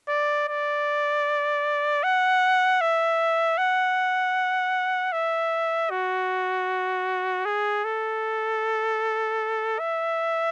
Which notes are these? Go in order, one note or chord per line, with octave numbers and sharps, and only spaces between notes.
D5
D5
F#5
E5
F#5
E5
F#4
G#4
A4
E5